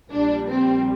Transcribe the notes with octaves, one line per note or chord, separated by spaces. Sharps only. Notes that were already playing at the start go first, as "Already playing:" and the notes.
A#1 A#2 G3 D4
C4